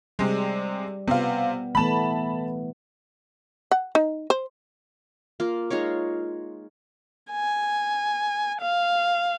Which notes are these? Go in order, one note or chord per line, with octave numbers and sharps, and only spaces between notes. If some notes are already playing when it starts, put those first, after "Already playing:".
C3 G3 G#3
C3 B3 F4
E3 A3 B3 A5 B5
F#5
D#4
C5
A#3 F4
G#3 D#4 F4 C#5
G#5
F5